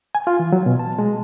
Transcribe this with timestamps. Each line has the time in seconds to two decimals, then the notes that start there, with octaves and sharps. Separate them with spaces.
0.15 G#5
0.27 F4
0.40 E3
0.52 F#3
0.66 B2
0.79 A5
0.99 G#3